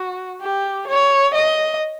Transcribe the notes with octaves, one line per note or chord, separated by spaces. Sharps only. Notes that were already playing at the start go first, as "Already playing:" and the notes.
Already playing: F#4
G4
C#5
D#5